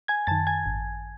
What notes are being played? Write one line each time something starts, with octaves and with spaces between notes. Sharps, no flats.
G#5 G#6
F#2 D#3 A5 A6
G#5 G#6
G#1